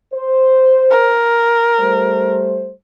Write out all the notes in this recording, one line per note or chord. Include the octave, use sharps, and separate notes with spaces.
C5
A#4
G3 A3 C5